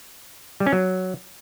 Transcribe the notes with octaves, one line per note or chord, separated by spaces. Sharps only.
G3
C#4
F#3